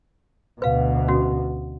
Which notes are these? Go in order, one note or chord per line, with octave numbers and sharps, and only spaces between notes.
D2 B2 B4 F5
C#4 F#4